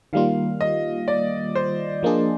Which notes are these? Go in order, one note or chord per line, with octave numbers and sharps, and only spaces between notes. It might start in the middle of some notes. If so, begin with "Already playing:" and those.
D#3 G3 A#3 F4 F5
D#5
D5
C5
F3 A#3 D4 G#4